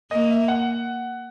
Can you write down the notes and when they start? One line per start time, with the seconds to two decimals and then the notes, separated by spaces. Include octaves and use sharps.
0.11 A#3 D#5
0.30 E5
0.48 F#5